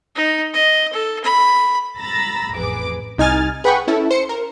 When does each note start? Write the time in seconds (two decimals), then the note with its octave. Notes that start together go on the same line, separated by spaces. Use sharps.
0.15 D#4
0.54 D#5
0.93 A4
1.24 B5
1.98 A#5 B5 E6 A6 A#6
2.55 A1 F2 G#4 B4 D6
3.18 C2 D#4 G#5 F6 A6
3.64 G#4 B4 F#5 G5 B5 C#6
3.88 C#4 E4 A4
4.11 C5 C#7
4.29 A#4